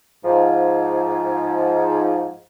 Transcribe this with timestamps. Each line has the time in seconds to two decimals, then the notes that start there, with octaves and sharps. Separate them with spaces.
0.24 G#2 F3